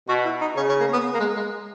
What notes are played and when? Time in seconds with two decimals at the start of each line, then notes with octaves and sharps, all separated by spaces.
0.08 B2 F#4
0.25 E4
0.41 D#4
0.56 C#3 C#4
0.69 C#4
0.80 A#3
0.93 B3
1.14 A#3
1.19 G#3
1.36 G#3